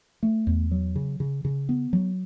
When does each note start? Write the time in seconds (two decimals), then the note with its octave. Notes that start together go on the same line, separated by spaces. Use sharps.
0.23 A3
0.47 E2
0.71 F#3
0.96 C#3
1.20 C#3
1.45 C#3
1.69 B3
1.93 F#3